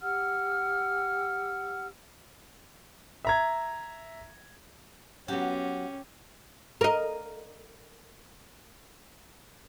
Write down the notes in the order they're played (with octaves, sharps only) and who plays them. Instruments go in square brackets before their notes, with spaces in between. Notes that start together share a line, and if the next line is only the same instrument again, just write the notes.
[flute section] G4 F#5 E6 F6
[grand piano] E5 A#5 G#6
[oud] F#3 B3 [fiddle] C#4 [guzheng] G4
[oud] A#4 D#5